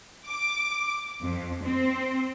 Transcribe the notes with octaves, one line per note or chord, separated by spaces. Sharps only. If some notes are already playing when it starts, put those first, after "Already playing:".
D6
F2
C4